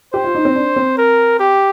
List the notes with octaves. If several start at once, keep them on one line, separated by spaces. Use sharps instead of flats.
G4 C5
F4
D#4
C4
D4
C4
A#4
G4